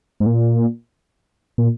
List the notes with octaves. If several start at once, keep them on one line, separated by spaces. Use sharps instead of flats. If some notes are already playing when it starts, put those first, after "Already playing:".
G#2
A#2
A#2